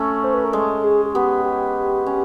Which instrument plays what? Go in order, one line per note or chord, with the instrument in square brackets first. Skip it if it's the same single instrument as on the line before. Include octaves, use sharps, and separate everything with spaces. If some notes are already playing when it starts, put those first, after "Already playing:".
Already playing: [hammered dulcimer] A3 C#4
[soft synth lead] C5
B4
A#4
[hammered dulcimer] G#3 [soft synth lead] A4
[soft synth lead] G#4
G#4
[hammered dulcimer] B3 [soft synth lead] G4
[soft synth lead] G4
[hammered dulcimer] C#4